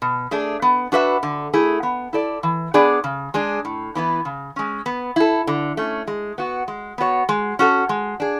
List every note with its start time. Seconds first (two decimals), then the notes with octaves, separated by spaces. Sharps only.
0.02 B2
0.31 A3 D4 G#4
0.62 B3
0.92 D4 F#4 B4 E5
1.23 D3
1.53 A3 E4 G#4
1.83 B3
2.13 E4 A4 D5
2.43 E3
2.74 B3 D4 G#4 D5
3.04 C#3
3.34 G#3 D4 G#4
3.65 A2
3.95 E3 B3 E4 B4
4.25 C#3
4.56 G#3 C#4
4.86 B3
5.16 E4 A4
5.47 D3
5.77 A3 C#4
6.07 G#3
6.38 B3 F#4
6.68 G#3
6.98 B3 F#4 C#5
7.29 G#3
7.59 C#4 F#4 A4
7.89 G#3
8.20 D4 G#4